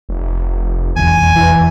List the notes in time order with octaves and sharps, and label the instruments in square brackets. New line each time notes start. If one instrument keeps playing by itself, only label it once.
[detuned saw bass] F1
[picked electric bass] F1 B1 E2 [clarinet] G#5
[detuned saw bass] E3